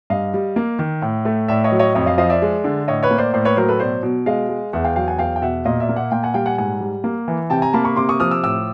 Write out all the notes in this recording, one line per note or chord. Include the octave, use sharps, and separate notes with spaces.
G2 D#5 F5
G3
A#3
D#3
A2
A3
A2 D5 E5
C#5 D#5
F#3
C#5 D#5
F2 C#5 D#5
D#5 F5
F3 D#5 F5
D5 E5
G#3
D3
A2 C#5 D#5
B4 C#5
A#3
C5 D5
A2 C5 D5
B4 C#5
F#3 A#4 C5
A4 B4
B2 C5 D5
B2
G#3 D#5 F5
G#3
E2 E5 F#5
F5 G5
F#3 F5 G5
F#5 G#5
E2 F5 G5
G5
B2 E5 F#5
A#2 D#5 F5
D5 E5
A#3
E5 F#5
A#2 F5 G5
F#5 G#5
G3 F5 G5
F#5 G#5
G#2 F#5 G#5
G3
A#3
E3
C3 G5 A5
G#5 A#5
A#3 A5 B5
B5 C#6
C3 C6 D6
C#6 D#6
F3 D#6 F6
D6 E6
A2 D6 E6